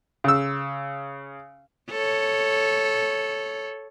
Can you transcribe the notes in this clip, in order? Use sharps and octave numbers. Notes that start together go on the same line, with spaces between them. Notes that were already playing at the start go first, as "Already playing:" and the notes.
C#3 E6
A4 C#5